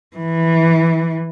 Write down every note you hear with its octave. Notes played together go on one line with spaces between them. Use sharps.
E3